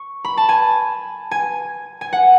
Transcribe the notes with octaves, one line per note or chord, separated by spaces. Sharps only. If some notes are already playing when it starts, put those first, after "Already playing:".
Already playing: C#6
B5
A5
G#5
G#5
G#5
F#5